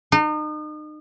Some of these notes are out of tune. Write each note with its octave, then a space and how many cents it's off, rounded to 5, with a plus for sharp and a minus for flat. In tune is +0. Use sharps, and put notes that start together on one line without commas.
D#4 -35